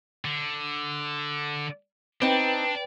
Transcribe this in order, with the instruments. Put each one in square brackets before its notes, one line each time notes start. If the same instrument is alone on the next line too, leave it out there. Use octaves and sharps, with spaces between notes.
[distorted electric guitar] D3
[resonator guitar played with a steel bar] C4 D#4 [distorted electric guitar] D4 [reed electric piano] B4 G5